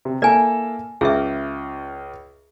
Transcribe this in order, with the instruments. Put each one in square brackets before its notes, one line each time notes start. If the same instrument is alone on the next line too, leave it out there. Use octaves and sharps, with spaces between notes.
[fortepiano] C3
[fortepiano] A#3 E4 A4 [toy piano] D5 G#5
[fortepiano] C#2 F4 D6 [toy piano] G#4 E5